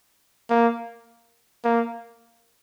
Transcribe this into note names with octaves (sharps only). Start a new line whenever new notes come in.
A#3
A#3